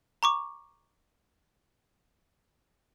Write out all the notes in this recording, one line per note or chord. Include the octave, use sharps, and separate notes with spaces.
A#5 C#6 D6